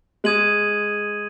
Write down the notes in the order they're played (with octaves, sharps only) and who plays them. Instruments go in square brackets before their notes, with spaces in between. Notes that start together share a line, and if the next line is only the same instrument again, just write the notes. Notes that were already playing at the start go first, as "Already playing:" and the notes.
[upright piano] G#3 [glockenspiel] D#6 G#6 D#7 F#7